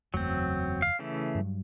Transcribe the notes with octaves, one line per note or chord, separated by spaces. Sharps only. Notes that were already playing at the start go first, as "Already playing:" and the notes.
F#1 E2 F#3 A3 C4
F5
C#3 E3 A3
G2 F#3